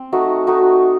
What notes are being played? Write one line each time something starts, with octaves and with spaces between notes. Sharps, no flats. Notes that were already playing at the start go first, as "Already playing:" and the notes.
Already playing: C4
A3 D#4 F#4
A3 D#4 F#4